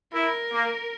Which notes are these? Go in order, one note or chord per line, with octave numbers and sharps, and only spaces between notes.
E4 A#4
A#3